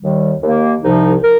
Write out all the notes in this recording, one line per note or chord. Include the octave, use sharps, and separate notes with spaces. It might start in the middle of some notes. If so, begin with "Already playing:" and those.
D#2 D#3 G3
D#2 D#3 A#3
C2 C3 F3 D#4
A#4